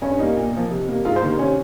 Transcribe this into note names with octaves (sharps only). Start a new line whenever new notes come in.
G2 C#4
G3 A#3 D#4
A#2
F3 A#3
C3
G3 A#3
G#2 F4
C5
D#3 G3 A#3
C3 C#4